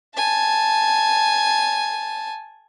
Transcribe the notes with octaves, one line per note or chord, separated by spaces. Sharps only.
G#5 A5